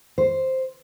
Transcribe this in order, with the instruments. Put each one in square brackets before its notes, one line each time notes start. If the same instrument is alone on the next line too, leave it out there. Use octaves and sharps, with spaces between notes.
[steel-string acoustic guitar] C5